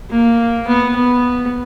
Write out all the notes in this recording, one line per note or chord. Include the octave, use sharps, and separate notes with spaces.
A#3
B3
B3